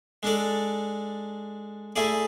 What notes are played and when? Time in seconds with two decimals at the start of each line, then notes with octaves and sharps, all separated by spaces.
0.23 G#3 D4 A4 D5
1.96 A3 E4 G#4 D5